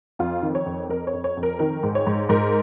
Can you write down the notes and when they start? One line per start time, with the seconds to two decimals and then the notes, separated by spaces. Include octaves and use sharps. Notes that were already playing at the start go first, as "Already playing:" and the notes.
0.19 F2 F4
0.42 D#3
0.55 C#5
0.66 F2
0.89 F2 A#4
1.07 C#5
1.13 F2
1.24 C#5
1.37 F2
1.43 A#4
1.59 D#3 A#4
1.83 G#2
1.95 C#5
2.07 G#2
2.29 G#2 A#4